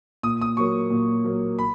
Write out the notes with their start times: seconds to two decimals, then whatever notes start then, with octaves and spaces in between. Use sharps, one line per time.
0.23 A#2 D#6
0.41 D#6
0.57 F#3 A#3 C#6
0.90 A#2
1.24 F#3 A#3
1.59 B5